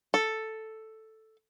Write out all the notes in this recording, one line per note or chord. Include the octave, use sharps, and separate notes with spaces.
A4